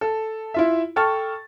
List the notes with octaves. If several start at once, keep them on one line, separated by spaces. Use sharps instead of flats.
A4
E4 F4 E5
A4 G5 A5 C#6 F6 A6